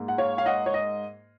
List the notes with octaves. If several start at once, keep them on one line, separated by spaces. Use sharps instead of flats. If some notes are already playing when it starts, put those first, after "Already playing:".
Already playing: G#2 A#3
F#5
C#5 F5
F5
D#5 F#5
C#5
D#5